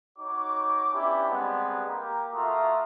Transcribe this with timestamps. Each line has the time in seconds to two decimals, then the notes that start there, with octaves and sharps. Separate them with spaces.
0.19 D#4 F#4 C#5 D6
0.93 B3 C#4 D4 E4 G4
1.28 G3 G#3 B3 C4 D4 G4
1.88 A#3 G4 A#4
2.34 A3 F4 F#4 E5 A#5 D#6